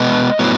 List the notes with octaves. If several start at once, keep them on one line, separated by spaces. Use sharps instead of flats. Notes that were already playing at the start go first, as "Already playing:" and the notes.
Already playing: B2 G#3 B3 D#5
A2 F#3 B3